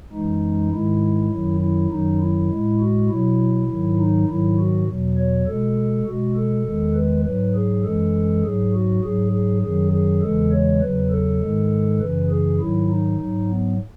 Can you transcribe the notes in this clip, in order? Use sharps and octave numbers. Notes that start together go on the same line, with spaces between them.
F#2 E3 G#3 D#4
G#2 D#3 G#3 E4
F#2 D#3 F#3
E4
F#2 D#3 F#3 D#4
E4
A2 G#3
F#4
B2 F#3 E4
G#2 D#3 F#3
D#4
G#2 D#3 F#3 E4
F#4
E2 B2 F#3
C#5
B2 G#3 A4
B2 G#3 F#4
A4
E2 D#3 G#3
B4
G#2 F#3 B4
G#4
F#2 E3 G#3 A4
G#2 F#3 G#4
F#4
G#2 F#3 G#4
G#4
F#2 D#3 F#3 G#4
G#4
E2 C#3 E3 G#3 A4
C#5
E2 C#3 F#3 B4
A4
G#2 D#3 G#3
F#2 C#3 E3 B4
G#4
G#2 D#3 F#3 E4
D#4
G#2 F#3
B3